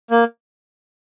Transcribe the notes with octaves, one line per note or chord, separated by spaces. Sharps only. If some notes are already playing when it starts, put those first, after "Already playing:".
A#3